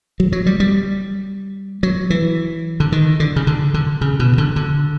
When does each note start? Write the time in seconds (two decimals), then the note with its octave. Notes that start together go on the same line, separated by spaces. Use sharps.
0.20 F#3
0.32 F#3
0.46 G3
0.60 G3
1.83 F#3
2.10 E3
2.80 D3
2.92 D#3
3.20 D3
3.36 C#3
3.47 D3
3.74 D3
4.01 C#3
4.20 B2
4.38 D3
4.56 D3